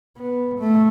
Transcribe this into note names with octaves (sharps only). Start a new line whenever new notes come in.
B3
A3